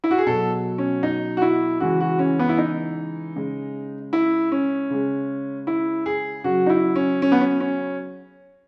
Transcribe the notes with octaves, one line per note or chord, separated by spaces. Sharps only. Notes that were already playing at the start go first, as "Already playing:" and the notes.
E4
F#4
G#4
B2 F#3 A4
C#4
D#4
F#4
E4
C#3 E3 G#3 F#4
F#4
C#4
B3
E4
D#4
C#3 G#3
E4
C#4
C#3 G#3
E4
G#4
C#3 F#3 F#4
D#4
E4
C#4
C#4
B3
C#4
C#4